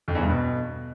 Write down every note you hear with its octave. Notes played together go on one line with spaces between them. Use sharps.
F2
E2
G2
B2